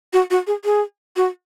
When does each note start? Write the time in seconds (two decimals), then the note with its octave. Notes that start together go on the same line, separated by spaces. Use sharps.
0.13 F#4
0.31 F#4
0.47 G#4
0.65 G#4
1.16 F#4